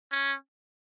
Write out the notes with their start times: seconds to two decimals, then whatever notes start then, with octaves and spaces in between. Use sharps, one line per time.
0.12 C#4